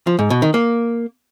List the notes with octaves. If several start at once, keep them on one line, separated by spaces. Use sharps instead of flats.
F3
G#2
B2
D#3
A#3